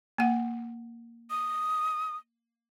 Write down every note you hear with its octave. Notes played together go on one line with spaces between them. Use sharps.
A#3 F#5
D#6